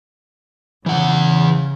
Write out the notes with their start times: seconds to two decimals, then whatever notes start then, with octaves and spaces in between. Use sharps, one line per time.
0.86 C#3 E3 F#5